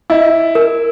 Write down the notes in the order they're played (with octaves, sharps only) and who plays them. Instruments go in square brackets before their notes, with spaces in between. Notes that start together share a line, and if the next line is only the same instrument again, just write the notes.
[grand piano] E4 [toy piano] D#5
[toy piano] A#4